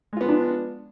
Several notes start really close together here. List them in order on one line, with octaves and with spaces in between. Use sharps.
G#3 F4 B3 F3 D4